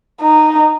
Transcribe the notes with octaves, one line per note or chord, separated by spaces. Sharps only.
D#4